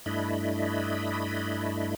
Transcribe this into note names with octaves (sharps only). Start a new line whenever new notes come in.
G2 A3 D4 E4 D#5 B5